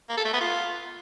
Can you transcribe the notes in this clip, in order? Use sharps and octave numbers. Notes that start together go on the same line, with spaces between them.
A#3
A4
A3
B3
F4